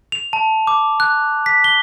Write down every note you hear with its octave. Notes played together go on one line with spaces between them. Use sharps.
F7
A5
D6
F#6
B6
G7